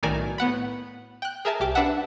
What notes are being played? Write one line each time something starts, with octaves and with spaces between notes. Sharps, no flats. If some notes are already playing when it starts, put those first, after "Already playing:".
B1 A2 D#3 A#4 D5 G#5
A2 B3 F#5 B5
G5 F#6
G#4 A#4 E5 G#5 A5
C2 G4 D6
D4 B4 E5 F#5